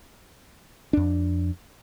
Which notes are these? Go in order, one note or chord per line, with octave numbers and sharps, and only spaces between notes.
F2 D4